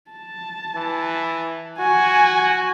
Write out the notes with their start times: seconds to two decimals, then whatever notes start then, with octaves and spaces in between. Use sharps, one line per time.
0.11 A5
0.76 E3
1.79 F#4 G#5